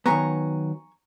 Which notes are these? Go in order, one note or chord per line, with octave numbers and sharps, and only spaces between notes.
D#3 F#3 B3 G#5 A#5 C#6